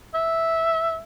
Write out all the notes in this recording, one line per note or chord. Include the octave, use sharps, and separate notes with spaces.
E5